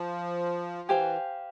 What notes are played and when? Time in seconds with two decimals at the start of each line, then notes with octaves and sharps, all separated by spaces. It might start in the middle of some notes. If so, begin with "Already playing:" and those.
Already playing: F3
0.88 E3 G4 C5 F5 G#5